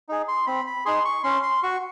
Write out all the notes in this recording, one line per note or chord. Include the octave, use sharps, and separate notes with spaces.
D#4 G#4
C6
C4 B5
B5
D#4 G#4 C6
C#6
C#4 C6
C6
F#4 C#6